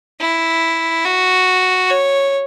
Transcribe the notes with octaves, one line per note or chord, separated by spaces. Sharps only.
E4
F#4
C#5